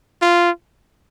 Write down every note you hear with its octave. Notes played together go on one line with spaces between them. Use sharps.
F4